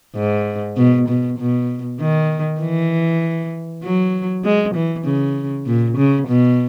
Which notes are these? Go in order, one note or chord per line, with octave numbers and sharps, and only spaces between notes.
G#2
B2
B2
B2
D#3
E3
F#3
G#3
E3
C#3
A#2
C#3
B2